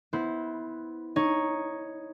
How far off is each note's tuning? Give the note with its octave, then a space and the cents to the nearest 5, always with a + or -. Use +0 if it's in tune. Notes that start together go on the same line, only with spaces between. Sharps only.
B3 +0 E4 -20 C5 +0
D#4 +0 C#5 +0